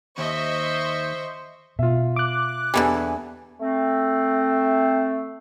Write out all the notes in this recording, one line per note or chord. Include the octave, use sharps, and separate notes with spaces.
D#2 C5 D#5 E5 C#6
B2 F4 E5
D6 F#6
E2 D3 E3 G3 G4 G#5
A3 C4